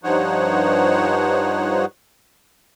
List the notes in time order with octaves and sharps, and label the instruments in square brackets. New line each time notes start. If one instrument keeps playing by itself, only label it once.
[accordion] G2 F3 D#4 C5 C#5 F#5